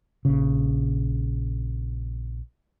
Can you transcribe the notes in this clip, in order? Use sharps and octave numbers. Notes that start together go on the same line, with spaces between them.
A#1 C#3